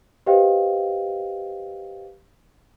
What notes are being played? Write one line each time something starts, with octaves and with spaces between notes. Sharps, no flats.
G4 B4 C5 D#5 F5 G5